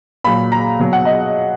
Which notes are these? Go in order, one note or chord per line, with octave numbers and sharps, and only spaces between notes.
A#2 F#3 B5
A#5
B2 F#3
F#5
D#5